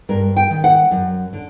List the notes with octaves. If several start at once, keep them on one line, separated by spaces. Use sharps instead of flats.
G2 A#4
G5
D#3
F#5
F#2
D3